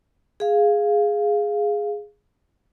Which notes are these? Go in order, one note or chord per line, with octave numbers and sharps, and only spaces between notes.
G#4 F5